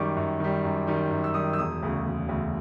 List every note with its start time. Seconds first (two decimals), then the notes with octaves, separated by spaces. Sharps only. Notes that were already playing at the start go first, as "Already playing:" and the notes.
Already playing: F#2 D#3 G3 C#6 D6
0.16 F#2
0.40 D#3 G3
0.64 F#2
0.87 D#3 G3
1.10 F#2
1.24 E6
1.34 D#3 G3 D#6
1.53 E6
1.59 E1 D#6
1.82 D2 C#3
2.06 E1
2.29 D2 C#3